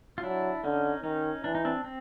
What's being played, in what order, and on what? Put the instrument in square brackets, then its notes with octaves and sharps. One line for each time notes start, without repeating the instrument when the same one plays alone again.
[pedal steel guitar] F4
[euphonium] F#3 [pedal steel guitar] D4 E4
[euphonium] D3 [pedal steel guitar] C#4 D#4
[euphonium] D#3 [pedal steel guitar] C#4 D#4
[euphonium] E3 [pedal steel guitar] D4
[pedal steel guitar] D#4
C4 D4
C4